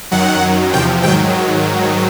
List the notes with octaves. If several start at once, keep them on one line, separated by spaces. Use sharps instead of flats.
F#2 D#3 F#3 F#5
F#2 D#3 F#3
E2 C3 F3 G5
G#2 D#3 F#3 G5